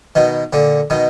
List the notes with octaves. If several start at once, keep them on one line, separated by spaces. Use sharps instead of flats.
B2 D#3
A#2 D3
B2 D#3